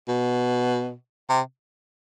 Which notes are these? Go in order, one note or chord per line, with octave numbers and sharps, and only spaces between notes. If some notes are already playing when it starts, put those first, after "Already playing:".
B2
C3